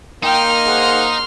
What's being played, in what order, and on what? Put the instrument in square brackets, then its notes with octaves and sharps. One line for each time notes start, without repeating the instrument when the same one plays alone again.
[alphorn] A#3 [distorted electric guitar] D#4 [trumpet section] G5 [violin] C6 F6
[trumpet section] G#4 C5 F#5